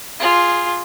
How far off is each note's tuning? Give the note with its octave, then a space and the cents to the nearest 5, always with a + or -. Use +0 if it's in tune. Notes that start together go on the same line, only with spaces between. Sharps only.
F4 +0 G#4 +0